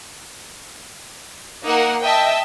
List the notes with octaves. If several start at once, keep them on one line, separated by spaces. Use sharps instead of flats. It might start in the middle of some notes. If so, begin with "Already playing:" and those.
A#3 D#4 A#4 F#5
D#5 E5 G5 A5